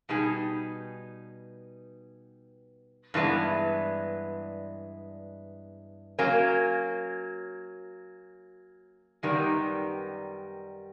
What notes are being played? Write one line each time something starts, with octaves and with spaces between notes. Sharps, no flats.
B2 G3 B3 D#4 G#4
G2 E3 G#3 B3
F#3 A#3 C#4
F#2 D#3 G3 B3 D#4